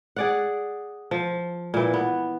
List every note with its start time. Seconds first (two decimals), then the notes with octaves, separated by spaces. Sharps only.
0.16 G#4 D5 F#5
1.11 F3
1.74 A#2 E3
1.93 B3